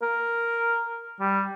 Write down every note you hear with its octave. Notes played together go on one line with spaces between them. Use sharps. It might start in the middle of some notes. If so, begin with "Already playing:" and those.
A#4
G3